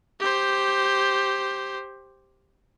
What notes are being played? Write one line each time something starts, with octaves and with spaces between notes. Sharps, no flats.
G4 C5